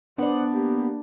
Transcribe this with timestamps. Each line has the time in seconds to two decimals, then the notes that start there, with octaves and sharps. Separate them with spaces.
0.18 B3 D4 C5 D5 F#5
0.50 A#3 G4